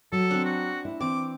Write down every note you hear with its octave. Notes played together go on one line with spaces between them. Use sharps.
F#3 A4
C4 D4
F#4
E4
E3 C4 D6